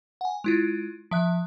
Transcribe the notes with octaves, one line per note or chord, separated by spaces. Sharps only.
F#5 G#5
G#3 E4 F4
F3 E5 F#6